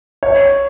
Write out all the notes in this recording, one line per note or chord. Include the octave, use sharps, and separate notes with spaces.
C#5